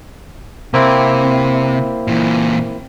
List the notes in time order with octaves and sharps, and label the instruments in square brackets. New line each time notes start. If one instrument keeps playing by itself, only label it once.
[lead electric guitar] C3 [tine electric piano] A#3 C4 E4
[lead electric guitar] A#2 E3